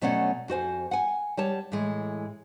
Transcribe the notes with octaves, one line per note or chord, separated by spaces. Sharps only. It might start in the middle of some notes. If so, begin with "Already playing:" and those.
B2 F#3 A3 C#4 D5 F#5
F2 F#4 C5 G#5
F#5 G#5
G3 C#5 A5
A2 E3 G#3